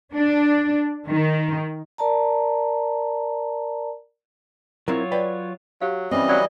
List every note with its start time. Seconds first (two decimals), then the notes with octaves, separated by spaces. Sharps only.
0.13 D4
1.08 D#3
1.98 A#4 D5 A5 A#5
4.88 F#3 C4 E4 F4 A#4 C#5
5.12 B4 D5 G5
5.81 F#3 G4 F5
6.11 E3 G3 C4 C#4 D#5
6.29 F#3 D5